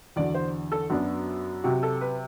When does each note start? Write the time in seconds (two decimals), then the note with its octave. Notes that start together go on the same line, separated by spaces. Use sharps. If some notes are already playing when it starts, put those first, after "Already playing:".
0.16 E2 D3 F#3 D5
0.34 C5
0.72 A4
0.90 F#2 F#3 B3 D4
1.64 C3 F#3 C4 F#4
1.83 A4
2.01 B4